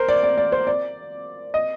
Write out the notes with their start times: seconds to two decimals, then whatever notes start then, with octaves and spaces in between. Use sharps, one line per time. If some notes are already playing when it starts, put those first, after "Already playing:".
Already playing: A#4 C5
0.08 D5
0.23 D5
0.38 D5
0.52 C5
0.67 D5
1.54 D#5